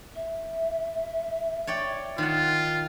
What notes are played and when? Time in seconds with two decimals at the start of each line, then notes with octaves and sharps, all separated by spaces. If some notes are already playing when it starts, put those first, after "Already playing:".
0.15 E5
1.67 C#5 D5 G5
2.18 D#3 F4 F#5